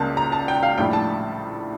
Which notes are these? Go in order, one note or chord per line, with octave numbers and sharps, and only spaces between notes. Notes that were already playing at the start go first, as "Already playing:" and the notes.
Already playing: C#2 C#3 G3 A#3 A5
A#5
A5
G5
F5
A#1 A2 G3 G5
A5